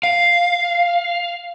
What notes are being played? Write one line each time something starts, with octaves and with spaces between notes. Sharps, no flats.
F5